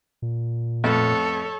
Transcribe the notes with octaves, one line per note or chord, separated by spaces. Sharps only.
A#2
F2 A2 B3 A4 C#5